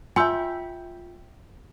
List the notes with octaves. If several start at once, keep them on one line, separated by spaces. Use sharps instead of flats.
F4 E5 G5 G#5 C6 E6 G6